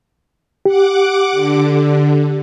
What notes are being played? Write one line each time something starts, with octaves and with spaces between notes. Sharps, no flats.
G4 F#5 D6
D3